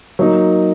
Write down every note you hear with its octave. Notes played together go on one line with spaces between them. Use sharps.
F#3 A#3 D#4